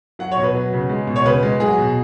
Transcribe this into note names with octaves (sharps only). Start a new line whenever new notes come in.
F#3 F#5
C#5
B2
B4
F#3
C#3
G#3
B2
C#5
C#3 B4
G#3
F#3 G#4
B2